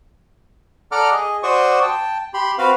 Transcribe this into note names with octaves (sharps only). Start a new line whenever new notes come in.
A4 D5 F#5 A#5 D6 F6
G#4 D#5
F#4 C5 D5 C#6 D#6
G5 A5
G4 B5 C6
C4 F#4 B4 F5